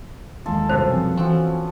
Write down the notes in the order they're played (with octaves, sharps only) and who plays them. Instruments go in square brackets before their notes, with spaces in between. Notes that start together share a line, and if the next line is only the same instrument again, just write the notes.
[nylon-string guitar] D#2 G#3 A#3 [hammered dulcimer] F4 A4
[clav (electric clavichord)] C2 F#2 B2 [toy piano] C5
[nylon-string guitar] F3 C4 G#5
[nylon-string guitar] E3 [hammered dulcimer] F3 C#4 F#4 [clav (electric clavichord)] C4